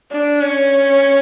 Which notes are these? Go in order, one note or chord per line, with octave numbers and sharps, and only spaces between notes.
D4
C#4